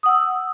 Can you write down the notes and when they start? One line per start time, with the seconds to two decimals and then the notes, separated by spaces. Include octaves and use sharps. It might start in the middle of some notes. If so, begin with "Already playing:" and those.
0.03 D#6
0.06 F#5
0.08 E6